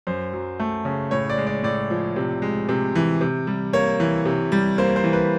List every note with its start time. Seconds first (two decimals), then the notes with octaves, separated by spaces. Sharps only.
0.07 F#2 C5
0.33 F#3
0.59 A3
0.85 C#3
1.11 A2 C#5
1.30 D5
1.38 G#3
1.47 D5
1.63 A2 D5
1.90 F3
2.16 C3
2.42 G#3
2.69 C3
2.95 E3
3.21 C3
3.47 G3
3.73 A#3 C#5
4.00 E3
4.26 C3
4.52 G3
4.78 A#3 C5
4.96 C5
5.04 E3
5.13 B4